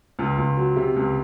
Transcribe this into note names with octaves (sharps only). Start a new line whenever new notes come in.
C#2 F4
C#2
F#3
C3
C#2